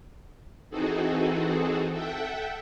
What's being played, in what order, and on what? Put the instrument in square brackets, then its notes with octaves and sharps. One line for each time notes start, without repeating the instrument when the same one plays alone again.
[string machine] E3 C4 D#4 F#4 G#4 A4
A4 E5 F#5 G5